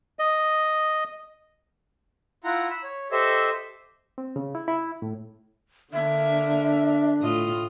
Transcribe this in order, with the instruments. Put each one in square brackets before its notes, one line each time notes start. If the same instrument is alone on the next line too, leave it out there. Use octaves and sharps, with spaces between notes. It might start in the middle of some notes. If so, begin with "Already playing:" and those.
[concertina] D#5
[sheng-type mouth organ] E4 F4 F#5 A#5
B5 E6
C#5
G4 A4 C5 D#5 E5 E6
[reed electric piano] C4
C#3
E4
E4
A2
[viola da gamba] D3 A#3 [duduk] D4 [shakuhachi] E5
[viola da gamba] A2 F4 D#5